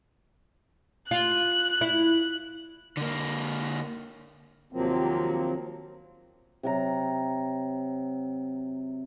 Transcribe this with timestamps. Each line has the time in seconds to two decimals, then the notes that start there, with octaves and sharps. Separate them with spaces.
1.11 F4 F#6
1.81 E4
2.97 D3 A#3
4.73 D#2 C3 F3 F#3 A#3 C4
6.63 C3 F#3 A#5